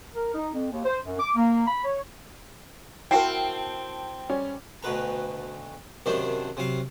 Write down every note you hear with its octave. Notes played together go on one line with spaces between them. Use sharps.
A#4
D#4
F2
D#2
C5
F#2
D6
A#3
B5
C#5
C4 E4 F#4 A#4 G5 A5 C7
G3 C#4
D2 B2 B4 A#5
F#2 C3 D#3 C4 D4
C3 F#3 F5